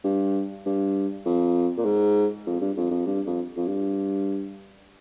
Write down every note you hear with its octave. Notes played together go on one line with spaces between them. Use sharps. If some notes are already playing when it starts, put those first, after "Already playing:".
G2
G2
F2
A#2
G#2
F2
G2
F2
F2
G2
F2
F2
G2